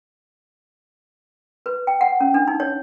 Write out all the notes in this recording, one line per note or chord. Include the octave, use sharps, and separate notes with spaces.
B4
G5
F#5
C#4
D4
D#4
C#5